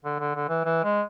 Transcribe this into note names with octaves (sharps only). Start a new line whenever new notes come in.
D3
D3
D3
E3
E3
G#3